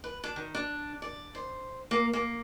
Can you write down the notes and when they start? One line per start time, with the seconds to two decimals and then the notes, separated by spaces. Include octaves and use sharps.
0.04 B4
0.24 D4
0.36 D#3
0.55 D4
1.02 D5
1.35 C5
1.91 A#3
2.13 A#3